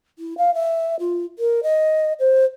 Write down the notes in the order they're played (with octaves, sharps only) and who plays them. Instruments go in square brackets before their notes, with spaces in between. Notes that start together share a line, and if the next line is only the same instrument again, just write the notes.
[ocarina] E4
F5
E5
F4
A#4
D#5
C5